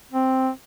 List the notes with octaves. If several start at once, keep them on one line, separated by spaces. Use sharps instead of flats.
C4